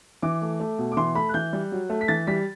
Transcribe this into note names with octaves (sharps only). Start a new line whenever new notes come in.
E3 D6
A3
A3
B2
D6
E3 C6
A3 B5
F#6
E3 G6
G3
F#3
A3
B6
E3 A6
G3 B6